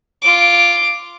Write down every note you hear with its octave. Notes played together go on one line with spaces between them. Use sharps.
F4 D6